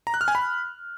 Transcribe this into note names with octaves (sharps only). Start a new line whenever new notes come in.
A#5
F#6
F6
G#5
B5